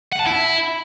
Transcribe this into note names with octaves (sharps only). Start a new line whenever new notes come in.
F#5
A5
E4